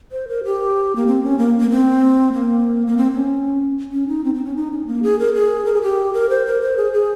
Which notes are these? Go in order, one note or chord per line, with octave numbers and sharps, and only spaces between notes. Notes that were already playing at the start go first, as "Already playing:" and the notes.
C5
A#4
G4
A#3
C4
C#4
A#3
A#3
C4
A#3
A#3
C4
C#4
C#4
D#4
C4
C4
C#4
D#4
C#4
A#3
G#4
A#4
G#4
A#4
G#4
G4
A#4
C5
A#4
C5
G#4
G#4